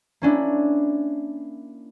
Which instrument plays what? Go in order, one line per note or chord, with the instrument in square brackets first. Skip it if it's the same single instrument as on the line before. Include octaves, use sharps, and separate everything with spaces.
[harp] A#3 C#4 D4 E4